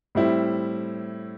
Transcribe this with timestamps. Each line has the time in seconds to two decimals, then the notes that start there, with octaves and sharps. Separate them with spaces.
0.15 A2 G3 C4 E4